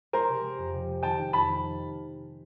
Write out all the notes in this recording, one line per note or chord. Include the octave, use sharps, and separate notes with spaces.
G#3 A#4 C5
C3
G#3
F2
C3
G#3
D#3 G5 A5
D#3
F2 A5 B5
D#3